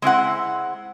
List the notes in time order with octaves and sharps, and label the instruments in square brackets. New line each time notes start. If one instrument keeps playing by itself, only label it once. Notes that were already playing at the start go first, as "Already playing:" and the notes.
[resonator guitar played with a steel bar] G#3 C4 E4 F#5